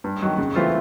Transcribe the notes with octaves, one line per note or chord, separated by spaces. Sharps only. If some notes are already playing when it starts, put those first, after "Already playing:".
G2
D#3 F#3
C#3
E3 A3 C4 F4